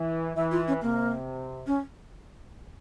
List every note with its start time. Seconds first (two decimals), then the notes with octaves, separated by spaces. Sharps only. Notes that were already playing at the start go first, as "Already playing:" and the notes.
Already playing: E3
0.36 E3 E5
0.51 F4
0.68 C#4
0.82 C3 A#3
1.67 C#4